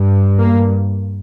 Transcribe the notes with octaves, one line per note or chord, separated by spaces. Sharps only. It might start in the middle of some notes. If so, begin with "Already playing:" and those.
Already playing: G2
A#3